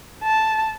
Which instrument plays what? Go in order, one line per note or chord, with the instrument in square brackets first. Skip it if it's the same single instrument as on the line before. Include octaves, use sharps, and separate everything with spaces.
[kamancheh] A5